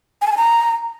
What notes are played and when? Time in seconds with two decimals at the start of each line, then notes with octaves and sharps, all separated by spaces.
0.22 G#5
0.27 A5
0.32 G#5
0.37 A#5